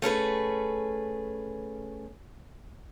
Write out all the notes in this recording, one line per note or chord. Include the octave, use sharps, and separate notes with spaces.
A3 C#4 G#4 B4